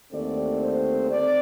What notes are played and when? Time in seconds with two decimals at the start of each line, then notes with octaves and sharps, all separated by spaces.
0.13 D#2 D3 A3 C4 D5
0.63 C5
1.11 C4 D5